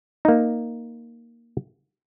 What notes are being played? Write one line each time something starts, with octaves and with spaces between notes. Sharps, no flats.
A#3 D#4